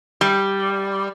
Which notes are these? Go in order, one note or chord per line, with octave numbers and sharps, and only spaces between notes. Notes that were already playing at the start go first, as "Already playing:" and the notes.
G3